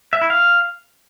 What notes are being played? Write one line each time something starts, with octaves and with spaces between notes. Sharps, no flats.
E5
E4
F5